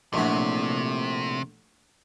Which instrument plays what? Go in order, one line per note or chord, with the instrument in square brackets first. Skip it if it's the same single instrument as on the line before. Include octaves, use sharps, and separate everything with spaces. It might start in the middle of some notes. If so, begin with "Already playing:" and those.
[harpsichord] A#1 A2 F#3 [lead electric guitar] C3